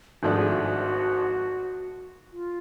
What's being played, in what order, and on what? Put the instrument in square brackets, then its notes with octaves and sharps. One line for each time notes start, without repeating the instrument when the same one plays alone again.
[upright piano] G#1 G#2 F3 A3 D4 [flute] F#4
[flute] G#4
F#4
F4